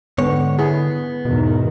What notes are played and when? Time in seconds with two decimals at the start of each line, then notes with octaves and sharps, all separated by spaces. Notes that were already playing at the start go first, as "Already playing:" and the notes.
0.18 G#2 D3 B3 C#5
0.59 B3 E4 G#4
1.25 E2 G#2 B2 D#3